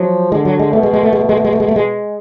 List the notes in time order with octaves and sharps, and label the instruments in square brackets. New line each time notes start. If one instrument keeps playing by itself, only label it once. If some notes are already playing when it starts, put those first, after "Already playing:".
Already playing: [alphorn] F3 [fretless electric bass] F#3
[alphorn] D3 [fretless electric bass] G#3
[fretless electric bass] F#3
G#3
[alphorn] B2 [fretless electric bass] A3
[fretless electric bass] G#3
G#3
A3
G#3
A3
G#3
A3
G#3
A3
G#3
A3
G#3